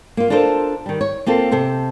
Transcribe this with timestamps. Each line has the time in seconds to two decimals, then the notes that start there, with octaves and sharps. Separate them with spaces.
0.17 A#3 F4
0.30 D4 F4 A4 A#4 C5
0.86 D#3 G3
1.01 C#5
1.26 A#3 C4 F4 A4
1.52 C3 A4 C5